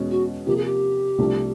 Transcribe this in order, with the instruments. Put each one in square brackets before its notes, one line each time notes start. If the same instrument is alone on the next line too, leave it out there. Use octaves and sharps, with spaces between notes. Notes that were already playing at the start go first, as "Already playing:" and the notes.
Already playing: [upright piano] E2 B2 G#3 C#4
[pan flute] F#4
[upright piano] C3 F3 A#3 [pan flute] G4
[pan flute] G#4
G4
[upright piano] C2 C3 F3 A3 D4